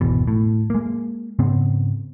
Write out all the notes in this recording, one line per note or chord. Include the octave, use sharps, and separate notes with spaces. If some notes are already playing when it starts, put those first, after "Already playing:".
G#1 E2 B2
A2
G#3 A#3
G#2 C#3 B3 C4